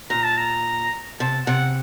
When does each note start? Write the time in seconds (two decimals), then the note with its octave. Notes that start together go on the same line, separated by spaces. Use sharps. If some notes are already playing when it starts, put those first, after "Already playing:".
0.10 A#2 A#5
0.24 A5
0.38 A#5
1.20 C3 A5
1.47 C3 F#5